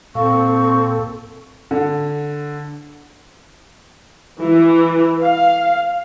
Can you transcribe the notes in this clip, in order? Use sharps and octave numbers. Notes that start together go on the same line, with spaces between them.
A#2 C4 A4 F5 C#6
D3
E3
F5